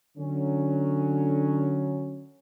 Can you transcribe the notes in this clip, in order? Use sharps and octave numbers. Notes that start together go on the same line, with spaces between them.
D3 F#3 C#4